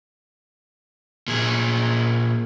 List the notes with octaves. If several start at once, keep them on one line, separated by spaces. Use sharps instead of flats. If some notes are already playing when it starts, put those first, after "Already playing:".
A#2 G#4